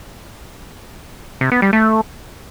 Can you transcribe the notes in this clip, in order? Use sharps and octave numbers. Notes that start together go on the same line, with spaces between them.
C3
B3
G3
A3